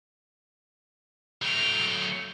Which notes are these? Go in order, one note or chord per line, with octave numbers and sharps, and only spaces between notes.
F#3 A3 G5 F6